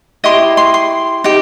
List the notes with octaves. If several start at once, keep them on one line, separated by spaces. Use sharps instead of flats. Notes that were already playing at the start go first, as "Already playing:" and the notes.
E4 G4 D#5 C6
C6
C6
D#4 G4